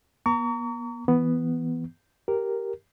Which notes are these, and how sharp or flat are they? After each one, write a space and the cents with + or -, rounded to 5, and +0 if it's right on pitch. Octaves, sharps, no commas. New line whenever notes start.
B3 -45 A#5 -25 C#6 +40
E3 +0 B3 +0
G4 -5 A#4 +0